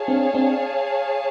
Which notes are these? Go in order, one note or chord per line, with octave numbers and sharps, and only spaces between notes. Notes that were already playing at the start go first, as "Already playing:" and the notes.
Already playing: G#4 C#5 F5 A5
C4 D4
C4 D4